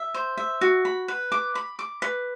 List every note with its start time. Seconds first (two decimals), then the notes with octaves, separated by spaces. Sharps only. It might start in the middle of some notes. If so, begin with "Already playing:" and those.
Already playing: E5
0.14 C5
0.37 E5
0.61 F#4
0.85 B5
1.08 B4
1.32 D6
1.55 B5
1.79 D6
2.02 B4